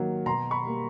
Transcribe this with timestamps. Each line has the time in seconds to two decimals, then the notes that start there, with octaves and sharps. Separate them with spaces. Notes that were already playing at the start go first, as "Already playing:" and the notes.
Already playing: D#3 F#3 A#3
0.26 B2 A#5 C6
0.51 B5 C#6
0.64 G3 A#3